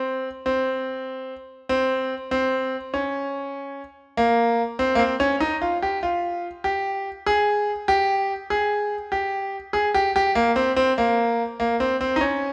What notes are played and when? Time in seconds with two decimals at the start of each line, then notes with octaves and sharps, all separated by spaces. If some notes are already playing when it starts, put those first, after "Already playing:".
Already playing: C4
0.46 C4
1.69 C4
2.31 C4
2.94 C#4
4.17 A#3
4.79 C4
4.95 A#3
4.99 C4
5.20 C#4
5.40 D#4
5.62 F4
5.83 G4
6.03 F4
6.64 G4
7.27 G#4
7.88 G4
8.50 G#4
9.12 G4
9.73 G#4
9.94 G4
10.16 G4
10.35 A#3
10.56 C4
10.76 C4
10.98 A#3
11.60 A#3
11.80 C4
12.01 C4
12.16 D#4
12.21 C#4